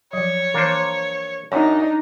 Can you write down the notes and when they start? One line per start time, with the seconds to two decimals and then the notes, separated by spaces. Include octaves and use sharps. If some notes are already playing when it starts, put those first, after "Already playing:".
0.13 F3 F#3 C#5
0.54 E3 A#3 D4 C5
1.52 F#2 D4 D#4 C#5